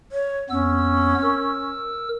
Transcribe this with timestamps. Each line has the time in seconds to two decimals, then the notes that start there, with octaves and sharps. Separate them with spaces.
0.12 C#5
0.50 F2 B3 C#4 E6
1.22 A#4 E6